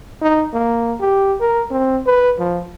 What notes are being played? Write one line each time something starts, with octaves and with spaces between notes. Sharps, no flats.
D#4
A#3
G4
A#4
C4
B4
F3